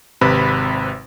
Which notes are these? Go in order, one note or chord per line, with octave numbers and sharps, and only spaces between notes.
G#1 C3 B4 B5